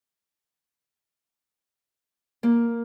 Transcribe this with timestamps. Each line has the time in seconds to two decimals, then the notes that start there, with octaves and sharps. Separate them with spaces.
2.43 A#3